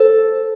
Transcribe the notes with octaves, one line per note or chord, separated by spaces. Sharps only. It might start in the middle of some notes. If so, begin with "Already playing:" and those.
Already playing: A4 C5